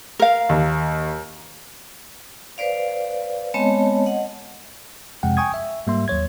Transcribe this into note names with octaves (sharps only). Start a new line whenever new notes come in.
A#4 F5
D#2
B4 C5 D5 F5
G#3 B3 C4 C#5 D#5 A5
D#5 F#5
F2 C3 G#3 F#5 G5
G5 G#5 C#6 D#6 G#6
E5
G#2 G3 A#3 E5 C6
D#2 F#3 C#5 G#6